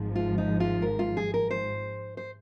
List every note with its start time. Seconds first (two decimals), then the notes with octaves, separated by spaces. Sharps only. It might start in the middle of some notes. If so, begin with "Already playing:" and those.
Already playing: G#1 G#2 F3
0.15 F4
0.38 D#4
0.60 F4
0.82 A#4
0.99 F4
1.17 G#4
1.34 A#4
1.51 C5
2.17 C5